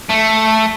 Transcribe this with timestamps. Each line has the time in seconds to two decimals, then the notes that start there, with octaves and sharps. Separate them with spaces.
0.09 A3